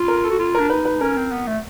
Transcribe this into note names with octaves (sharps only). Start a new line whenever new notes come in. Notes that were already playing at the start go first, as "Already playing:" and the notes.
Already playing: F4
A#4
A4
F#4
F4
D4 A#4
D#4 B4
B4
C#4 A#4
C4
B3
A3